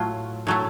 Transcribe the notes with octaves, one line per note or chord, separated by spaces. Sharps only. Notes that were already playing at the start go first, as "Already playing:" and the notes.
Already playing: A2 F#3 A3 F4
A2 F#3 A3